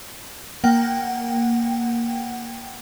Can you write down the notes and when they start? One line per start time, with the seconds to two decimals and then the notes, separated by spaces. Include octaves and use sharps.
0.64 A#3 F#5 G5